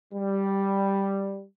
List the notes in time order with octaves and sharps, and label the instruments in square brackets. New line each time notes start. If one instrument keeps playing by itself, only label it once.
[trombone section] G3